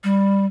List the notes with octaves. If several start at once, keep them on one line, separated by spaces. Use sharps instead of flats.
G3